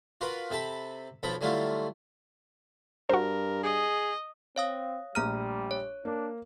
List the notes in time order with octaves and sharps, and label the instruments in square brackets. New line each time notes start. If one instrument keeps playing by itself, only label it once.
[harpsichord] F4 F#4 A#4 B4
C3 A4 A5 B5
B1 F3 A4 A#5 B5
D3 F#3 G3 A3 E4 F4
[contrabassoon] G2 [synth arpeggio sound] F#4 C5 [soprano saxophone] A#4
[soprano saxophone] G#4 [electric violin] D#5
[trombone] C4 [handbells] C#5 F5 D#6
[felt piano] A#1 D#7 [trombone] G3 [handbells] A3 A#5 F6
[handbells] C#5
[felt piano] A#3 [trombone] D4